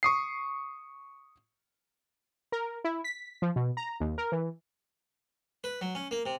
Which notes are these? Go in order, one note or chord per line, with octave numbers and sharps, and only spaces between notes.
C#6 D#6 C7
A#4
E4
B6
F3
B2
A#5
D#2
A#4
E3
B4
F#3
C#4
A#3
C3